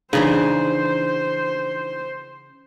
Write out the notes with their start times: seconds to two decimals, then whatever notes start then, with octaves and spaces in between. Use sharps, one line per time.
0.13 C#3 E3 D4 D#4 C5